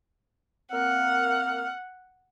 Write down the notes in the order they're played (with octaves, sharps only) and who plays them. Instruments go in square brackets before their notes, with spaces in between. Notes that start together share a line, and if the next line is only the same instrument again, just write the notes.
[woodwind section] A#3 C4 F6 [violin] F#5